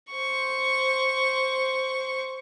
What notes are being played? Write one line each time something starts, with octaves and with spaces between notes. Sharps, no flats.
C5 C#6